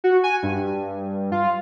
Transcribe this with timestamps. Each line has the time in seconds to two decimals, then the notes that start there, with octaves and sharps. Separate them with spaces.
0.04 F#4
0.24 G#5
0.43 G2
1.32 F4